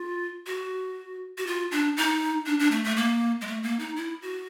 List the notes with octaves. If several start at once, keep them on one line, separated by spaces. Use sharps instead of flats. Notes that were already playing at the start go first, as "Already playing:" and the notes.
Already playing: F4
F#4
F#4
F4
D4
D#4
D4
D4
A3
A3
A#3
G#3
A3
A#3
D#4
E4
F#4